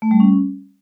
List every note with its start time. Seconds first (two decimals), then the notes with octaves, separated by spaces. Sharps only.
0.02 A3
0.11 G3
0.20 C#4